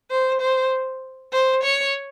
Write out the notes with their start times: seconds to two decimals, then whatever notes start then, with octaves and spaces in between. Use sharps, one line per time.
0.10 C5
0.41 C5
1.32 C5
1.63 C#5